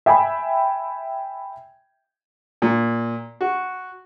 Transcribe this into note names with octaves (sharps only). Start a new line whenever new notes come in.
E5 G5 G#5 B5
A#2
F#4